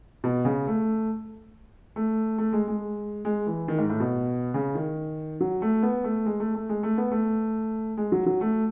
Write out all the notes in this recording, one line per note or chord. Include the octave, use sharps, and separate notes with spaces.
B2
C#3
A3
A3
A3
G#3
G#3
G#3
E3
D#3
G#2
A2
B2
C#3
D#3
F#3
A3
B3
A3
G#3
A3
A3
G#3
A3
B3
A3
G#3
F#3
F#3
A3